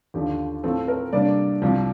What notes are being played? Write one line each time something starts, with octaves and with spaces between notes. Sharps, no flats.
D#2 D3 F3 G4
A2 F3 C4 A4
A#4
C3 G3 A#3 D4 D5
C2 C3 F3